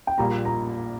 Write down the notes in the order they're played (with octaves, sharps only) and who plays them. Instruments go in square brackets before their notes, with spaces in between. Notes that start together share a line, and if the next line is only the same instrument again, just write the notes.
[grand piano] G5
[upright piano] A#1 A#2 G3 [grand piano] A#5
[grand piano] A#5